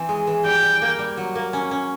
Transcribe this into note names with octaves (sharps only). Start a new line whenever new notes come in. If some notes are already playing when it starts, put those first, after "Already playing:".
Already playing: E3 C4
G#3
E3
G3 G5
G3
A#3
G3
F#3
A#3
C#4
C#4